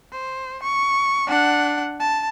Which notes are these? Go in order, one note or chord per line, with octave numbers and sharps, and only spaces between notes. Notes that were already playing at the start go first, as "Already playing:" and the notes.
C5
C#6
D4 F#5
A5